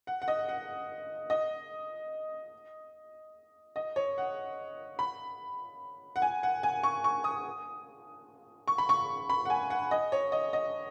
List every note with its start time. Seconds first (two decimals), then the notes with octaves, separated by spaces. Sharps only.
0.07 F#5
0.22 F#5
0.28 D#5
0.49 F#5
1.30 D#5
3.76 D#5
3.96 C#5
4.18 F#5
4.99 B5
6.16 F#5
6.22 G#5
6.43 F#5
6.63 G#5
6.83 C#6
7.04 C#6
7.24 D#6
8.68 C#6
8.78 B5
8.89 C#6
9.30 B5
9.45 F#5
9.50 G#5
9.70 F#5
9.91 D#5
10.12 C#5
10.32 D#5
10.53 D#5